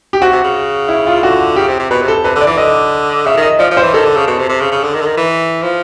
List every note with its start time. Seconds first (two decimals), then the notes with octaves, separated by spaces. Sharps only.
0.13 G4
0.21 C3 F#4
0.33 C3
0.44 C#3
0.89 E4
1.07 F4
1.23 D3 F#4
1.56 C#3 G4
1.68 C3
1.79 C3
1.91 B2 B4
2.02 C3
2.08 A4
2.24 C3 B4
2.36 D3
2.41 D5
2.47 E3
2.58 D3 D#5
3.26 C#3 E5
3.37 D#3
3.42 D#5
3.59 F3 D5
3.71 F3
3.77 C5
3.82 E3
3.94 D#3 A4
4.05 D3
4.16 C#3
4.27 B2
4.39 C3
4.49 C3
4.61 C#3
4.72 C#3
4.84 D3
4.94 D#3
5.01 D3
5.06 D#3
5.18 E3
5.63 F3